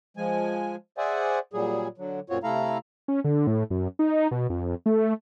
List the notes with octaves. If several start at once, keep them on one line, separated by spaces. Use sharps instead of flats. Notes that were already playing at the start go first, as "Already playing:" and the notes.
F3 G#3 G#5
G#4 C5 D5 E5 F#5 G#5
A#2 F#3 G3 G#4
D3 F#3
F#2 A#2 C4 F4 F#4 C#5
C3 A3 E4 A4 F5 A#5
C#4
D3
A2
F#2
D#4
B2
F2
A3